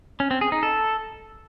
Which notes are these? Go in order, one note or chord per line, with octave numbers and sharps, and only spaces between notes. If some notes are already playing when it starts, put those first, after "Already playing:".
C#4
C4
G#4
D#4
A4